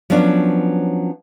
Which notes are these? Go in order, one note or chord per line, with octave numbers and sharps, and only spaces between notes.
F3 F#3 B3 C#4 D4